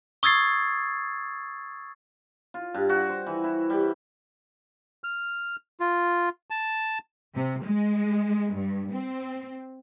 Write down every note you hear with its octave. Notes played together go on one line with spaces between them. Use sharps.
C#6 D#6 E6 G#6 A6 C7
F4
G2
F#4
C5
E3
E4
G3
F6
F4
A5
C3
G#3
G2
C4